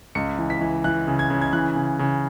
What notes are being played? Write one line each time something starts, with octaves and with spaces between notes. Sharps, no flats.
C#2 C#7
E3
B6
E3
E3 F#6
C#3
G#6
C#3
G#6
E3 F#6
C#3
C#3